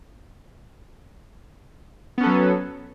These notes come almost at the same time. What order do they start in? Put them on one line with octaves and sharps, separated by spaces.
B3 C#4 A4 F#3